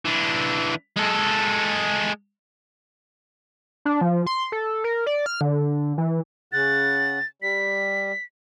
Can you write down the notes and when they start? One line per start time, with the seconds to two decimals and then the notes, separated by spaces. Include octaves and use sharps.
0.05 E3 D4
0.97 G#3 A4
3.85 D4
4.01 F3
4.27 C6
4.52 A4
4.84 A#4
5.06 D5
5.26 F6
5.41 D3
5.98 E3
6.52 C#3 F#5 A6
7.42 G3 B6